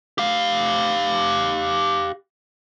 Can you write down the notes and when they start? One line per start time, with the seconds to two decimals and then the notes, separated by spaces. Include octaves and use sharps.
0.18 G4 F5